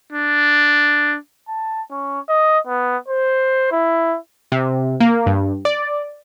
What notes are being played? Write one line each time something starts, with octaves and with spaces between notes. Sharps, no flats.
D4
A5
C#4
D#5
B3
C5
E4
C3
A#3
G2
D5